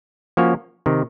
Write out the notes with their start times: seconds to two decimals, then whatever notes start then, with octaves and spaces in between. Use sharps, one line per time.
0.37 F3 A#3 C#4 F#4 C#5
0.86 C3 D#3